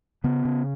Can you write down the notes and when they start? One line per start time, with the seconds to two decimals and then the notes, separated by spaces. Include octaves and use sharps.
0.24 C#3 B3
0.45 C#3